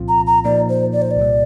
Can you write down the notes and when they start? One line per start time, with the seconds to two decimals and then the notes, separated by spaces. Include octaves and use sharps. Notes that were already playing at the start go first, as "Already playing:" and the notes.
Already playing: C2 A#2 F3 C4 F4
0.08 A#5
0.27 A#5
0.45 A#2 F3 A#3 D#4 D5
0.69 C5
0.93 D5
1.02 C5
1.11 D5
1.17 C2 A#2 G3